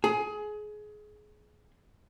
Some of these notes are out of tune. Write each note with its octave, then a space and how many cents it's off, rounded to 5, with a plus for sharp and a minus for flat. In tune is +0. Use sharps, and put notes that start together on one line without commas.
G#4 +25